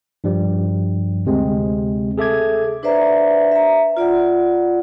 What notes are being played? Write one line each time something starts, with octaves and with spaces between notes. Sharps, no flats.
G2 F3 G3
D2 C3 G#3 C4
G#4 A4 E5 D6 G#6
D4 B4 C5 D5 E5 A#5
E5 A#5
F4 D5 F#5